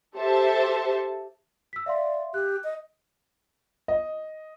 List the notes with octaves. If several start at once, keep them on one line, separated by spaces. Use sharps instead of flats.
G4 A4 C5 E5 A5
E6 B6
D5 E5 F5 C6
G4 F#6
D#5
D#5